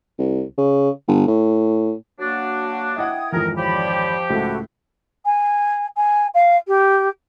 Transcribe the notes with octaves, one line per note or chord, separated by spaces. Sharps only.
C2
C#3
G1
A2
F#3 A#3 D4 F#4
E4 D#5 F#5 G5 D#6 G#6
G#1 F2 E3 A#4
F3 G4 C#5 D5 B5
C#2 A2 E4 F#4 A4
G#5
G#5
F5
G4